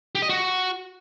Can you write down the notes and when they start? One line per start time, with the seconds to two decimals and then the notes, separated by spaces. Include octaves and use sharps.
0.15 G4
0.22 D#5
0.29 F#4